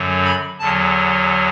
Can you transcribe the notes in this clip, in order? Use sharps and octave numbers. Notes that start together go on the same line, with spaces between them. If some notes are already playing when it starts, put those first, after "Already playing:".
Already playing: F#2 D3 F#3
B5
E2 D3 F#3 A5